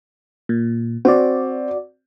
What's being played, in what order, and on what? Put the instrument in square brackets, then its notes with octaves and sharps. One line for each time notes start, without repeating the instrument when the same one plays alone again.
[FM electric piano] A#2
[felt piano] C4 [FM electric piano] F#4 D5